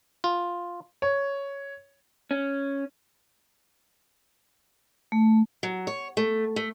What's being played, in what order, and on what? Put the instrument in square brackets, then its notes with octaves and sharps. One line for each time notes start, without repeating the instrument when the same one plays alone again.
[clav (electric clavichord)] F4
[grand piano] C#5
[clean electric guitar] C#4
[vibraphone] A3
[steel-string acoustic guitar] F#3
C#5
A3
A3